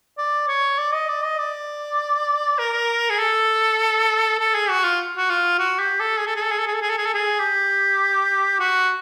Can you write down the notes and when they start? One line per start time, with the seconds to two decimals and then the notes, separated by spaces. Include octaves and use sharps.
0.18 D5
0.48 C#5
0.78 D5
0.94 D#5
1.08 D5
1.23 D#5
1.38 D5
2.58 A#4
3.10 G#4
3.19 A4
4.39 A4
4.55 G#4
4.69 F#4
4.84 F4
5.17 F#4
5.30 F4
5.59 F#4
5.79 G4
6.00 A4
6.19 G#4
6.27 A4
6.35 G#4
6.43 A4
6.51 G#4
6.59 A4
6.67 G#4
6.75 A4
6.81 G#4
6.90 A4
6.98 G#4
7.06 A4
7.14 G#4
7.39 G4
8.60 F#4